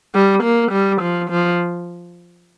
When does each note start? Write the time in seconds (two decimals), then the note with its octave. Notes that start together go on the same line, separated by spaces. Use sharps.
0.15 G3
0.44 A#3
0.72 G3
1.02 F3
1.30 F3